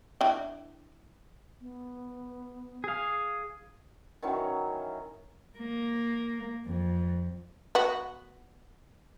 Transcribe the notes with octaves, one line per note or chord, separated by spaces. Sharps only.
E3 D4 G5
B3
G#4 F5 D#6
D#3 E3 F#3 C#4
A#3
F2
B3 F#4